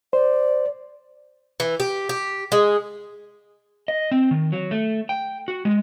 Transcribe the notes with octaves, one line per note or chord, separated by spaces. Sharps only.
C5 D5
E3
G4
G4
G#3
D#5
C4
D#3
F#3
A3
G5
F#4
G#3